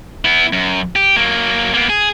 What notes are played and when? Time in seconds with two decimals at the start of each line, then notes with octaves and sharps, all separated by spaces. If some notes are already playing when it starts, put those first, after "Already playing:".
0.25 B3 E4
0.53 F#2
0.96 G4
1.16 F#3 A#3
1.74 A#3 B3
1.89 G#4